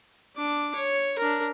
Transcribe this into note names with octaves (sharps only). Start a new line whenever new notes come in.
D4 D6
C#5
D4 A#4